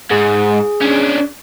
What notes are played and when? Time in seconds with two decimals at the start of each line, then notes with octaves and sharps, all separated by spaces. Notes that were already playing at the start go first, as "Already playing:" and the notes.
0.11 G#2 G#4
0.81 C#4 D4